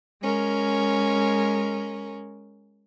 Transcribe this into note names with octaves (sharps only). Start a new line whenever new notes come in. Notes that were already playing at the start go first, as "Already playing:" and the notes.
G#3 C#4 A#4